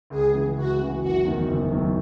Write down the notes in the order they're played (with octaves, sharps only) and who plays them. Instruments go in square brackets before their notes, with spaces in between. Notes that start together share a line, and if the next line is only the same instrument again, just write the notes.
[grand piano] C#2 [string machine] G#4
[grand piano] C#3 E3
[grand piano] C#2 [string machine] F#4
[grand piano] C#3 E3
[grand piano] F#1 [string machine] F#4
[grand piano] E2 D#3 F#3
F#1
E2 D#3 F#3